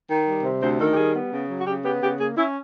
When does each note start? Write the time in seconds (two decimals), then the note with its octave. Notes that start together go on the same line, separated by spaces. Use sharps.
0.09 D#3
0.27 G3
0.44 C3
0.62 D2 C5
0.80 D#3 A4
0.92 G4
0.97 G3 G#4
1.15 B3
1.32 C#3
1.50 F#3
1.60 F#4
1.67 C#3 G4
1.85 B3 G4
2.02 C#3 G4
2.20 A#3 G#4
2.37 C#4 E4